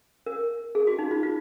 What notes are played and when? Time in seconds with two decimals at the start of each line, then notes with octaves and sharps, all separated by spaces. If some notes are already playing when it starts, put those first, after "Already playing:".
0.26 A#4
0.75 G#4
0.87 F#4
0.99 D#4
1.11 F4
1.23 F4